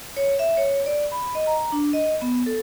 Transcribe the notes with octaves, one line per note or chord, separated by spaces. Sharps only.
C#5
E5
C#5
D5
B5
D#5
A#5
D4
D#5
B3
A4